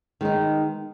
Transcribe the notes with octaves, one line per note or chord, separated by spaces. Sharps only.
D#3 G#3 B3 D#4